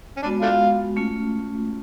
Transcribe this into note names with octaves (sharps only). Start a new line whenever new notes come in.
C#4
G#3 B3 D4 F#4
A3 D4 F4
A3 C#4 F4